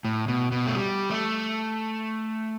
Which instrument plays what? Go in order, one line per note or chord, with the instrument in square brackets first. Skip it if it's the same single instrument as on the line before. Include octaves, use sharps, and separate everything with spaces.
[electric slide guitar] A2
B2
B2
A3
G3
A3